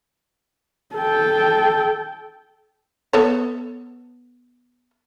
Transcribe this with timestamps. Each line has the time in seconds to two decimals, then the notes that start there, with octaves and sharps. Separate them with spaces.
0.96 A4 G5
3.13 B3 A4 C#5